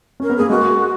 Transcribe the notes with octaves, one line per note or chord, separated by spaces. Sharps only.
C#4 A#4
B3
A#3 G#4
G#3 F#4